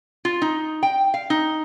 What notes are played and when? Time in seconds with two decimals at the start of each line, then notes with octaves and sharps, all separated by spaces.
0.25 F4
0.42 D#4
0.83 G5
1.14 F5
1.30 D#4